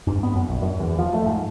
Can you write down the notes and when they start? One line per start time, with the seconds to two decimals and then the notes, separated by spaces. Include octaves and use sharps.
0.07 G2
0.23 B3
0.35 F#2
0.49 A#1
0.62 F#2
0.80 E2
0.99 F3
1.14 A3
1.26 G#2